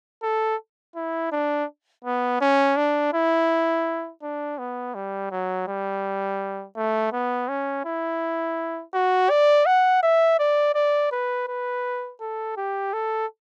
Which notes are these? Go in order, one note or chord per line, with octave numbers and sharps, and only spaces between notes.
A4
E4
D4
B3
C#4
D4
E4
D4
B3
G3
F#3
G3
A3
B3
C#4
E4
F#4
D5
F#5
E5
D5
D5
B4
B4
A4
G4
A4